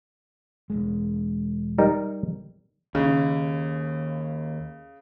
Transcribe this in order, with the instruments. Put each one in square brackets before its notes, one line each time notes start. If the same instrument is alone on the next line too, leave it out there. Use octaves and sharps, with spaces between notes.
[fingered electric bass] E1 C#2 G#3
[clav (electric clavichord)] G3 D#4 A#4
[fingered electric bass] D#2 [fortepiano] C#3